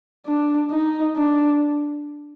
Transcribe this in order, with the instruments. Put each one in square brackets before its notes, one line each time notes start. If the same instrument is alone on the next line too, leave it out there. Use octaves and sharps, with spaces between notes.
[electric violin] D4
D#4
D4